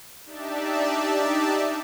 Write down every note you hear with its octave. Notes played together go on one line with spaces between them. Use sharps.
D4 D#4 G4 D5 E5 A5